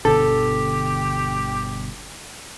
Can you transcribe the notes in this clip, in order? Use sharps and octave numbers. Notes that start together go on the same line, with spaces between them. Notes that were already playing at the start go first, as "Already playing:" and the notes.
G1 B2 D3 G4 A4